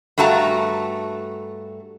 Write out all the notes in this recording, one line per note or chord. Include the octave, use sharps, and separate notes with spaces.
G2 A3 F#4 A5 A#5